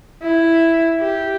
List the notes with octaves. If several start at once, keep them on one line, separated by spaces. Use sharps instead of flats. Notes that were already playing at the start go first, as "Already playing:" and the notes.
E4
G4